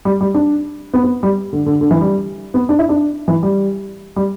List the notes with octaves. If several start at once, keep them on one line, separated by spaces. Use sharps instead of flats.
G3
G3
D4
B3
B3
G3
D3
D3
D3
E3
G3
B3
D4
E4
D4
E3
G3
G3